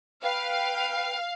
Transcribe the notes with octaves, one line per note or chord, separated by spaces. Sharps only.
B4 F5 G5